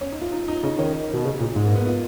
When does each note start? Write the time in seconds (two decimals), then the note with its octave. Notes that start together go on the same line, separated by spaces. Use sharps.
0.01 C#4
0.12 D#4
0.22 F4
0.32 D#4
0.48 D#4
0.63 C#3 D#4
0.79 D#3 C#4
1.14 B2
1.25 C#3
1.40 A#2
1.55 G#2 G#3
1.66 A#3
1.76 B3
1.87 F4